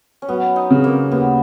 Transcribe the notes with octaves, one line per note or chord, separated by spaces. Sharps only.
C#4
F#3 B3
D#4
C#3
A#3
D#2 B3